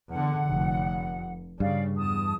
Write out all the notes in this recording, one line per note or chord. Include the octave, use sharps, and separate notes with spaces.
E2 D3 F#5
F1
G2 C#3 D5 F5
E2 A5 D#6